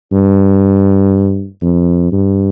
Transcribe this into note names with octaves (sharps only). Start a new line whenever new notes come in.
G2
F2
G2